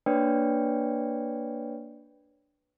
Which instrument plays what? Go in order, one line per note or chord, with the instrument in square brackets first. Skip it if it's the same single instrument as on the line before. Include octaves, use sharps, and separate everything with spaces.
[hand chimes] A#3 D4 B4 C#5 D5 G5